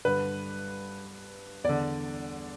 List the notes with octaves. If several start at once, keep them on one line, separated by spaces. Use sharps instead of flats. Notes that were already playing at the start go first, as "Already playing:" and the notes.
G2 D3 B4
E2 D3 D5